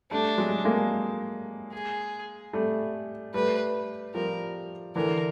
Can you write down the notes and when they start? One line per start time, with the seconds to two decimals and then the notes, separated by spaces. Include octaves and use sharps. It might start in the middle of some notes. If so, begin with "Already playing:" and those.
0.11 G3 A3 D4
0.38 F#3 G#3
0.65 G#3 A#3
1.73 G#4
2.53 G3 A3
3.34 G3 A3 B4
4.14 F3 G3 A#4
4.96 D3 E3 A#4